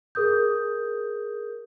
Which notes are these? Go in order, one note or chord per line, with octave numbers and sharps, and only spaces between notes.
G#4 A#4 D#6 G6